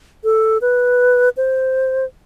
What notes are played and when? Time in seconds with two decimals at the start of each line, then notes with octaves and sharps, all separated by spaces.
0.24 A4
0.61 B4
1.37 C5